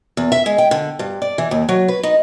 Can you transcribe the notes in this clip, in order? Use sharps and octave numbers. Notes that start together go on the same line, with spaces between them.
E2
E5
G#3
G5
D3
G2
D5
E3
D#2
F#3
B4
D#4